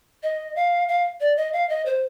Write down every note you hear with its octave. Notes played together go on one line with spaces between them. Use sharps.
D#5
F5
F5
D5
D#5
F5
D#5
C5